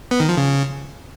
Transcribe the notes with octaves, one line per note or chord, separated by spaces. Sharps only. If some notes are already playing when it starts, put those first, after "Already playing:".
B3
D#3
F3
C#3